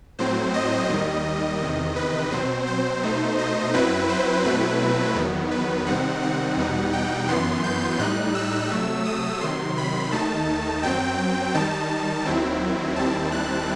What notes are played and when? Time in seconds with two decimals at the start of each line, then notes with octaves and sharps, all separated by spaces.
0.19 A2 F#3 C4 C5
0.54 D#5
0.89 D#2 D#3 G3 D#5
1.60 E2 C3 D#3 D#5
1.96 B4
2.32 B2 F#3 C4 C5
2.67 C5
3.03 B2 A3 D#4
3.38 D#5
3.74 F#2 F#3 C4 E4 B4
4.09 C5
4.44 B2 F#3 A3 C4 E4 B4
5.15 E2 D#3 F#3 B3
5.51 B4
5.86 C3 D#3 G3 C4 D#4 F#5
6.22 F#5
6.57 E2 B2 G3 D#4
6.93 G5
7.28 F#2 E3 B3 C6
7.64 G6
7.99 A2 G3 D#4 F#6
8.35 E6
8.71 C3 F#3 A3
9.05 D#6
9.41 C3 D#3 F#3 C6
9.77 B5
10.12 D#2 D#3 A3 D#4 A5
10.83 F#2 F#3 C4 G5
11.54 D#3 G3 D#4 A5
12.26 D#2 D#3 F#3 C4 E4
12.96 D#2 D#3 G3 C4 E4 A5
13.32 F#6